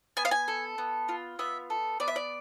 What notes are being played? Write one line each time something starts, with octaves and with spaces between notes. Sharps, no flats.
B3 G#5
F5
G#5
A4
B3
F4
B3 E5
A4
B3 D5
E5
D5